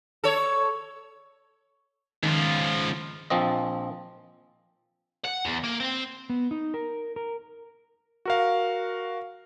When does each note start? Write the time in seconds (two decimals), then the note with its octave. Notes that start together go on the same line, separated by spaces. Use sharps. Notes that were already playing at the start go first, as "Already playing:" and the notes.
0.24 A4 C#5
2.23 C#2 D#3 F3
3.30 A#1 F3 C4 D#5
5.25 F#5
5.45 E2
5.64 A#3
5.80 C4
6.30 B3
6.51 D#4
6.74 A#4
7.16 A#4
8.25 F#4 A#4 F5